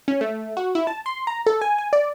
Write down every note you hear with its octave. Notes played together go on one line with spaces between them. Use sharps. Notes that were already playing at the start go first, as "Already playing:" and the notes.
C#4
A3
F#4
E4
A5
C6
A#5
A4
G#5
G#5
D5